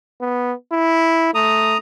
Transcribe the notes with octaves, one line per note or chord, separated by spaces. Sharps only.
B3
E4
A3 A#5 D#6